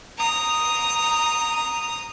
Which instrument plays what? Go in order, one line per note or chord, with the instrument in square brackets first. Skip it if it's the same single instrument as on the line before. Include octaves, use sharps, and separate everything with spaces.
[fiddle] A#5 D#6